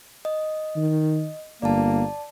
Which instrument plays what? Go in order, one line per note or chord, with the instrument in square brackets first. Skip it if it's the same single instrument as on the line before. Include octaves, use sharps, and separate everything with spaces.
[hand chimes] D#5
[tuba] D#3
[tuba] G1 [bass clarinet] A#3 [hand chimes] D5 A5